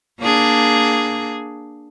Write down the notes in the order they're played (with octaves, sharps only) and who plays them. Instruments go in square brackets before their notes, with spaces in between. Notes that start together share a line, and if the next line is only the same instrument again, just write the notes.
[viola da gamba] A#3 D4 G#4